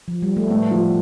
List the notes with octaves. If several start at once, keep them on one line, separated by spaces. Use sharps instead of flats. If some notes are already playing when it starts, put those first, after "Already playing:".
F3
G3
A3
A2 B3
F3